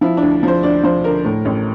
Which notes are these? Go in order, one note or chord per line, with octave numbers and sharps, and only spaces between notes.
F3 E4
D4
D2
F3 C5
D2 D5
F3 C5
D3 A#4
A2
A1